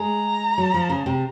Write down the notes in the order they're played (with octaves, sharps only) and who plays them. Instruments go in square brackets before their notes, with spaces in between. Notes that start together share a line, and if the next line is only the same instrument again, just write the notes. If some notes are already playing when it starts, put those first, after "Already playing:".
Already playing: [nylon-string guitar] G#3 [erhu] A#5
[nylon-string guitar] F#3
F3
C#3
C3